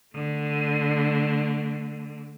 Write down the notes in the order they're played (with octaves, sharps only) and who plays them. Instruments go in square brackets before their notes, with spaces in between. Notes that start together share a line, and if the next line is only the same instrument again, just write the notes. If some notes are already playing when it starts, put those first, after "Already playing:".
[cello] D3 A3